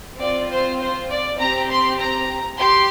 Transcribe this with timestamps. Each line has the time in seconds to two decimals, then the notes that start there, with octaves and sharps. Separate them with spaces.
0.19 C4 F4 D5
0.50 C5
0.80 C5
1.09 D5
1.40 C4 G4 A#5
1.70 C6
2.00 A#5
2.60 G4 C6